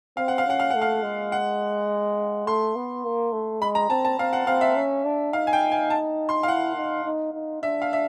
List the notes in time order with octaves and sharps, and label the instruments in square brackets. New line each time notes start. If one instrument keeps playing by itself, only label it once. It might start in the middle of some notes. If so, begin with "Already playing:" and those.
[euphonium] C4 [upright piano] F5
[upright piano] F#5
F5
[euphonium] C#4 [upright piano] F#5
[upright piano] F5
[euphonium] A3 [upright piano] F#5
[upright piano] F5
[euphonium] G#3
[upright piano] F#5
[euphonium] A3 [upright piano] C6
[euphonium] B3
A#3
A3
[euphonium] G#3 [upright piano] B5
[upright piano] A#5
[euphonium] C4 [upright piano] A5
[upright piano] A5
[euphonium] C4 [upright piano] F5
[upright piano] F#5
[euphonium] C4 [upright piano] F5
[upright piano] E5
[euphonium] C#4
D4
[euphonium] D#4 [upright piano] F5
[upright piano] G#5
G5
G#5
A5
C6
F5
[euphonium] E4 [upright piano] F#5
[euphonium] D#4
D#4
D#4
[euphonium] D4 [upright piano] E5
[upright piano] F5
E5